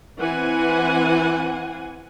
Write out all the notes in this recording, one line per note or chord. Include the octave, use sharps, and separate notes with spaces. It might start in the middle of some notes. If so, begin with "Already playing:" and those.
E3 C4 F#5 G#5